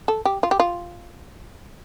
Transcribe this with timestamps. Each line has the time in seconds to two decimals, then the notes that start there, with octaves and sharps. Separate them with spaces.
0.08 A4
0.25 G4
0.43 F4
0.51 G4
0.60 F4